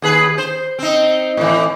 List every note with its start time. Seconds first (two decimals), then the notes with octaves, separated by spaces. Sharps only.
0.02 D#2 G#4 B4
0.38 C5
0.79 C4 D#4
1.37 A2 E3